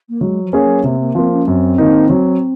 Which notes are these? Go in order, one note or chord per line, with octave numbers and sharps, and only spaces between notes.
A#3
F#3 G#3
F3
A#3 C#4 G#4 C#5
F#3
C3 A#3
A#3
F3 A#3 C4
C#4
F#2 C4
D#3 A#3 D#4
F#3